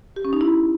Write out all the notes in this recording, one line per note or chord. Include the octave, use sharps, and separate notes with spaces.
G4
C#4
D#4
E4